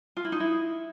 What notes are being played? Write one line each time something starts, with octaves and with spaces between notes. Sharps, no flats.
F4
E4
D#4
E4